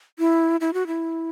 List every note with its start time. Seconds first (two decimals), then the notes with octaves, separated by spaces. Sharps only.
0.19 E4
0.61 E4
0.74 F#4
0.87 E4